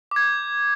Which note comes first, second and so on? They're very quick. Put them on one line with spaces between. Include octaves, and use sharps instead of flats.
D6 G#6 G6